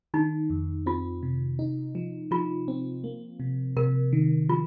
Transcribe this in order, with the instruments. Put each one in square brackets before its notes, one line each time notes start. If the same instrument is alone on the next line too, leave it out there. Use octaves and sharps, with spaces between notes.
[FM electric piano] D#3 [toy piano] D#4
[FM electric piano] F2
[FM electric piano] C4 [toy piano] F4
[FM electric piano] C3
D#4
F3
[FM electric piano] F3 [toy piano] F4
[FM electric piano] C4
A#3
C3
[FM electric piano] C3 [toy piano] A#4
[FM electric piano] D#3
[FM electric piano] F3 [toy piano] F4